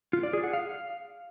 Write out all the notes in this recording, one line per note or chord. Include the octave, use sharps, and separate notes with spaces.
F4
D5
G#4
F#5
F5